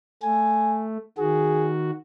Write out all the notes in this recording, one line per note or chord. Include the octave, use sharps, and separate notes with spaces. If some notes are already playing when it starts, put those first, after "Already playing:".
A3 G#5
D#3 F#4 G#4